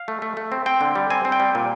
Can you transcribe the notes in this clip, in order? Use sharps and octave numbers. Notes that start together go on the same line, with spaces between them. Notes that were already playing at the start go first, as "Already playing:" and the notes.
Already playing: F5
A3
A3
A3
C4
C4 G5
D3
G3
C4 G#5
C4
G5
G3
A#2